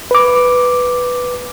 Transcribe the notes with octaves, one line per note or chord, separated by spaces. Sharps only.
B4 D6